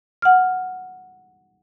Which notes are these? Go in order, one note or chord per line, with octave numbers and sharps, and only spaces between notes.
F#5 F6